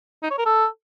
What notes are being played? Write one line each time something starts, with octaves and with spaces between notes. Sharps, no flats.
D#4
C#5
A#4
A4